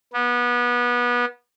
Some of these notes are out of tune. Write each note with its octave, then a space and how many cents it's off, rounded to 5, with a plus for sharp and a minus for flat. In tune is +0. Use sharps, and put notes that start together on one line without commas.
B3 -25